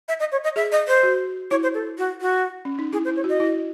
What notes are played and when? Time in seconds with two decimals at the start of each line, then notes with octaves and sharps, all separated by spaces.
0.08 E5
0.20 D#5
0.32 C#5
0.44 D#5
0.56 G#4 E5
0.72 D#5
0.88 C5
1.03 F#4
1.51 E4 C#5
1.63 C5
1.74 A4
1.98 F#4
2.21 F#4
2.65 C#4
2.79 D#4
2.93 E4 G#4
3.05 C5
3.08 E4
3.16 C#5
3.24 F#4
3.29 D#5
3.40 E4